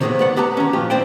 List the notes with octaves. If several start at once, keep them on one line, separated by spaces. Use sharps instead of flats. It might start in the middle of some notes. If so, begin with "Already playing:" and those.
C3 D#3 F#3 G#3 A#3 B3
B4 D5 F#5
B3 G4 B4 D5 A5 A#5
D#3 C#4
A#2 F3 F4 G4
C4 E4 C5 D5 G5